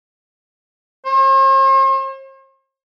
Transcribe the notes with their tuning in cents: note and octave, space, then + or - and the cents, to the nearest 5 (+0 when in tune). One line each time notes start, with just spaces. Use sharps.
C5 +45